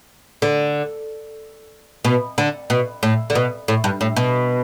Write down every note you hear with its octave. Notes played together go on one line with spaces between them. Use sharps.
D3
B2
D3
B2
A2
D3
B2
A2
G2
A2
B2